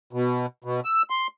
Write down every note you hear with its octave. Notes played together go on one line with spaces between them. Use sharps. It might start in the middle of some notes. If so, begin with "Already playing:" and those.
B2
B2
E6
C6